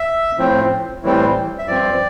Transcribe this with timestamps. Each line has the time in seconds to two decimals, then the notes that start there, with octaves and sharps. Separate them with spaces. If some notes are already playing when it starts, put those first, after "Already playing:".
Already playing: E5
0.39 A2 F3 C4
1.03 A2 E3 G3 C4
1.59 E5
1.67 G2 F3 C4 D5